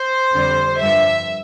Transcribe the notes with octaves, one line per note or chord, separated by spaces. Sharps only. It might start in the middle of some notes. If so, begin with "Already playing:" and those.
Already playing: C5
F2 D3 G3
G2 F3 E5